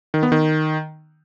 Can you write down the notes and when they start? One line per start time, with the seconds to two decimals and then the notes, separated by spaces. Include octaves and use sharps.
0.14 D#3
0.23 B3
0.32 D#3